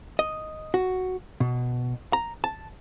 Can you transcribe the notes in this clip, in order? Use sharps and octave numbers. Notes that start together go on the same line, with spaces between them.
D#5
F#4
B2
A#5
A5